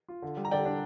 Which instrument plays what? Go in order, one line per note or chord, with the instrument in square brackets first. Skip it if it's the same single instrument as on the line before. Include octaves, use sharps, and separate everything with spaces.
[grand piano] F4
D3
G3
[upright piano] A#5
[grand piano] D3 [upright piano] D5 G5
[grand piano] D4